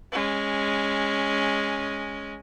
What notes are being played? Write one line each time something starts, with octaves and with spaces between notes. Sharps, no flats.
G#3 C#4